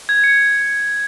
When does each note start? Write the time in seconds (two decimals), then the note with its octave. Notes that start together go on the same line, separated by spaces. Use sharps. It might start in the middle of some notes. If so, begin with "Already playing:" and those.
0.09 G#6
0.24 C#7